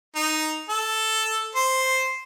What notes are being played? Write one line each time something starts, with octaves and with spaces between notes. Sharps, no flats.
D#4
A4
C5